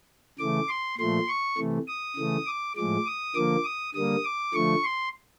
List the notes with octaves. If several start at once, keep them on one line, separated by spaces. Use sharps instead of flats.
C#3 E3 A3 D6
C6
A#2 F3 A3 C6
C#6
C3 E3 A3
D#6
C#3 E3 A3
D6
A2 F3 G#3 D6
D#6
D3 F3 A#3 D6
D#6
D3 G3 A#3 D#6
D6
D3 F3 A3 C#6
C6